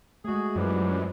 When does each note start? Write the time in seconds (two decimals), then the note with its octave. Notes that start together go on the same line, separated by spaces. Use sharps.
0.25 G#3 A3 F#4 G#4
0.56 F#2 E3 F3 D4 G4